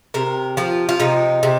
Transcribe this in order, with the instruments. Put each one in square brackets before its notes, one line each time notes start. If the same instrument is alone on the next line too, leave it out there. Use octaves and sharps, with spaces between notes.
[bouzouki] C3 A#4
F3 F4
F4
C3 D#4
C3